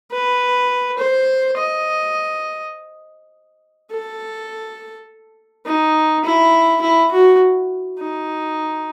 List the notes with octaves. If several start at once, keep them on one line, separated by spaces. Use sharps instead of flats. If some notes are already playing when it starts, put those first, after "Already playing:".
B4
C5
D#5
A4
D#4
E4
E4
F#4
D#4